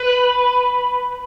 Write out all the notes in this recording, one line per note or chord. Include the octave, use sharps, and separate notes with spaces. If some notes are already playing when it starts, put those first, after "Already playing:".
Already playing: B4